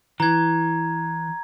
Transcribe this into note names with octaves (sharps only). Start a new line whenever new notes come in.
E3 A#5 G#6